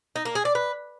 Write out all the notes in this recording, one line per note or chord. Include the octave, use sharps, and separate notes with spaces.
D#4
A#3
G#4
D5
B4